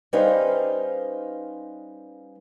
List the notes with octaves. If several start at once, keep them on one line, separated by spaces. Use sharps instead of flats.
G3 C#4 D#4 B4 C5 F5